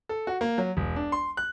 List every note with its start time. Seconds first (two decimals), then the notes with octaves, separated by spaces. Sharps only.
0.09 A4
0.27 F#4
0.41 A#3
0.58 F#3
0.77 E1
0.96 D4
1.12 C6
1.37 F#6